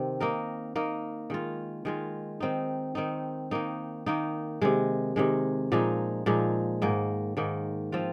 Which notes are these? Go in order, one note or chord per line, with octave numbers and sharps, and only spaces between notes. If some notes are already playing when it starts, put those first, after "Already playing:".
Already playing: C3 D#3 C4
A#3 D#4 A#4
A#3 D#4 A#4
D#3 G#3 F4
D#3 G#3 F4
D#3 C4 D#4
D#3 C4 D#4
D#3 A#3 D#4
D#3 A#3 D#4
C3 D#3 G#3
C3 D#3 G#3
A#2 F3 G#3 D#4
A#2 F3 G#3 D#4
G#2 D#3 A#3
G#2 D#3 A#3
F3 C4 F4